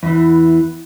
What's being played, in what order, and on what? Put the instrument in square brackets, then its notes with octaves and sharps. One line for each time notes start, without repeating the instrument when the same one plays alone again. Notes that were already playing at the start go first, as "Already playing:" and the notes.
[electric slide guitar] E2 E3